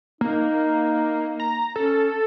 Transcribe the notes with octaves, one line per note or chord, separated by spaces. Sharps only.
A#3 D#4
A#5
C#4 A4